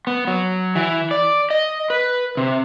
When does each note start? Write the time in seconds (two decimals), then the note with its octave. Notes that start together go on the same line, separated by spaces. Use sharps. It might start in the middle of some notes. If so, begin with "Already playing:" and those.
0.07 B3
0.27 F#3
0.75 E3
1.11 D5
1.50 D#5
1.90 B4
2.37 C3